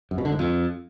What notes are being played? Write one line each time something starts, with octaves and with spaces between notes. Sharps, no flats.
F#2
B2
D3
G#2
F2